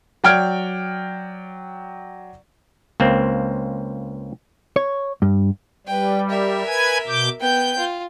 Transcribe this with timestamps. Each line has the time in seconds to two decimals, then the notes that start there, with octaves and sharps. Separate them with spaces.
0.24 F#3 D5 G5 F6 G#6 D7
3.00 C#2 A#3 C4
4.76 C#5
5.22 G2
5.87 G3 B4 G5
6.29 A#4 E5
6.67 B4 G#5 G#6
7.07 B2 D6 G6
7.40 B3 G5 G6
7.78 F4